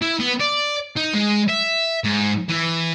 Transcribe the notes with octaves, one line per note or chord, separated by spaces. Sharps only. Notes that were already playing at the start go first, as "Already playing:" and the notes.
E4
B3
D5
D#4
G#3
E5
G#2
E3